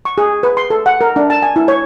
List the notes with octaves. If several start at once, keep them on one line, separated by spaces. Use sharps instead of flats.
C#6
G#4
B4
C6
A4
F#5
A#4
D4
A5
G#5
E4
C#5